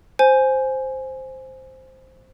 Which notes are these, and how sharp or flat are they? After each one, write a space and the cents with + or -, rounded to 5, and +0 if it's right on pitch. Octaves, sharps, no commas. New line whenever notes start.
C5 +0 G#5 +5